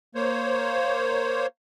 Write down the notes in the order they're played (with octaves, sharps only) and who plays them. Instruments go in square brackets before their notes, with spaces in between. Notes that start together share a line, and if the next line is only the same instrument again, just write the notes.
[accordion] A#3 C5 C#5